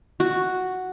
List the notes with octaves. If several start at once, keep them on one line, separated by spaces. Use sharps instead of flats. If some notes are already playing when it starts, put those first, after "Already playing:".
F#4